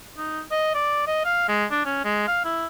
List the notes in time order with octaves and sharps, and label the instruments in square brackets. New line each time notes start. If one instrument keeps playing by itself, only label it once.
[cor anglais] D#4
D#5
D5
D#5
F5
G#3
D4
C#4
G#3
F5
E4